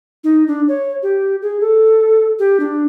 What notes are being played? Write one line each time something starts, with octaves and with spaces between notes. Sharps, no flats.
D#4
D4
C#5
G4
G#4
A4
G4
D4